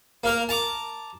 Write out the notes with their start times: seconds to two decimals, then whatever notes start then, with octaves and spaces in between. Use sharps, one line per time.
0.24 A#3 A#4 A#5
0.49 A5 A#5 D6